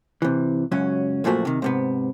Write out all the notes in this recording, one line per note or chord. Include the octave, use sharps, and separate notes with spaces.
C3 E3
C#2 F#2 F#3 C#4
F#2 A#2 F3 A3 F#4
C3 D#3
G#2 C3 B3